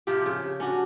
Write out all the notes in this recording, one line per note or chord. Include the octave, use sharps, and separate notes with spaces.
C3 F3 F4 G4
C#3
C#4 D4 F#4